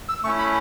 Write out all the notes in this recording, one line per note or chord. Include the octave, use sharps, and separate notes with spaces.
E6
A3 C#4 E4 C#6
B5